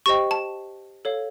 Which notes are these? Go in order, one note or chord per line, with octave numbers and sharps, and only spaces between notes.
G4 C5 D#5 G5 C#6
A5
A4 C#5 F5